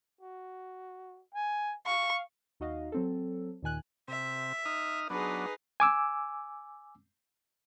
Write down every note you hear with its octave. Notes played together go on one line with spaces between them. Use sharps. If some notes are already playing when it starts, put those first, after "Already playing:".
F#4
G#5
F5 C#6
D#2 D#4 F#4 D#5 F5
F#3 C4 A4
D#2 A#2 D#3 G#5 F#6
C3 E5
D#4 D#6 F6
F#3 B3 D4 D#4 G#4 B4
G#5 D6 E6